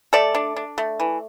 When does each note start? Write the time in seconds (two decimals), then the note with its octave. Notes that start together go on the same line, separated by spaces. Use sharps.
0.13 A3 A4 D5
0.35 D4
0.56 D4
0.78 A3
1.00 E3